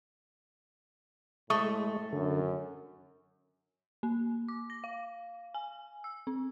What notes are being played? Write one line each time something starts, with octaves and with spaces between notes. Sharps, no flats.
A2 G#3 A3 C#6 D#6
F#2 D3
A#3
D6
A#6
F5
G#5
E6
C4